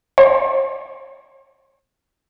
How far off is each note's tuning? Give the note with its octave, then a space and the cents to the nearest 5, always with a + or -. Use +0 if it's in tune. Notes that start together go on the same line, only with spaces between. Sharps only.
C#5 -40